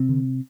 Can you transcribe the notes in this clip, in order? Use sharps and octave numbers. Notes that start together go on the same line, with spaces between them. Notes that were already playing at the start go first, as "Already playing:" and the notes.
Already playing: C3 C4
D3